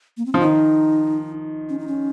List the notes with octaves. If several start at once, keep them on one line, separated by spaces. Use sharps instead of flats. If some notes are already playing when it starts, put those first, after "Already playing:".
A#3
C4
F3 C#4
D#3 D#4
C#4
D#4
C#4